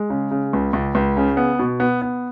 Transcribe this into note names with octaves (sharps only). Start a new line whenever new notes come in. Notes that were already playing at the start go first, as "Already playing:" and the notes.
Already playing: G#3
C#3
C#3
C#2
C#2
C#2
C#3
B3
B2
B3
B3